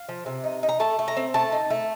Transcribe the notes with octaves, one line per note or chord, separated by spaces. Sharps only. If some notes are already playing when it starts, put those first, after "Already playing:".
Already playing: F5
F3
C3
D#4
D#4
A#5
A3 A5
A3
A#5
C4
A3 A5
D#4
A3